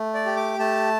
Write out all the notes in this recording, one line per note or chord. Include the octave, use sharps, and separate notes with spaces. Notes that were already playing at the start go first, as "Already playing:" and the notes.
Already playing: A3
D5
G4
D6
A3 A5